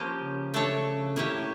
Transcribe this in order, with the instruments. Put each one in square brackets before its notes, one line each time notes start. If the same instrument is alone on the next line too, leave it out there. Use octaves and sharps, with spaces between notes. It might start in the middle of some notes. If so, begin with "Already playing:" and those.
Already playing: [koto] F3 A#3 C#4 G4
[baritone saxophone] C#3
[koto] A3 D4 A4 C#5
[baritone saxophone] A2 [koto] A#3 C#4 E4 G4 C#5